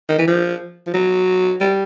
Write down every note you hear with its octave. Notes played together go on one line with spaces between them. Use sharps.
D#3
E3
F3
F3
F#3
G3